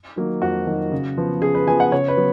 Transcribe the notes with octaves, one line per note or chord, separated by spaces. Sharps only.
D#3 F#3 A#3
F2 F#4
D#3 F#3 A#3
C#3
F3 B3
C#3 G#4
B4
F3 B3 G#5
F#5
C#3 C#5
B4
F#3 B3